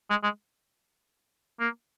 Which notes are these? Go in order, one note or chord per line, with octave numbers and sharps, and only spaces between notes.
G#3
G#3
A#3